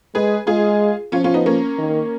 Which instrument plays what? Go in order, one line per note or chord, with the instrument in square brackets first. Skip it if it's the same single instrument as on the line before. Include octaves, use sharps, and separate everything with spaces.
[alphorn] G#3 [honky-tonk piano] G#4 B4
[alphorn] G#3 [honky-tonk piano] F4 G#4
[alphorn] F3 [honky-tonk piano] C#4 F4
[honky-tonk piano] C#4 F4
B3 D#4
A#3 C#4
[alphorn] D#3